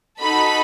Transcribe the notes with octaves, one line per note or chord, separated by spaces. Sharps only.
D#4 F#4 A4 B5